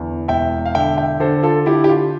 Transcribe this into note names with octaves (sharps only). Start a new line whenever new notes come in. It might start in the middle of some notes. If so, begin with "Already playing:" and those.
Already playing: E2 D3
E1 E5 G5
F5
D3 E5 G5
E5 G5
D3 A4 C5
F4 A4
D3 E4 G4
G4
F4